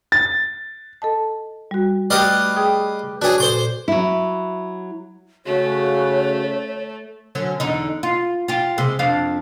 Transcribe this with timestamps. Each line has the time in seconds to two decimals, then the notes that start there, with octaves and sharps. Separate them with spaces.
0.12 A6
1.02 A4 D#5 A5
1.71 G3 F#4
2.10 A3 G4 B4 D5 D#5 F5 D6 A6
2.56 G#4 G5 D#6
3.22 D4 F#4 G#4 B4 C#5
3.38 A#2 A4 C5 C6 D6
3.88 F#3 E4
5.46 C#3 A3 F#4 C#5
7.35 D3 F#3 C#4
7.60 E2 D3 D#4
8.03 F4
8.48 F4 G4
8.78 C3 G#3
8.99 F2 D4 F5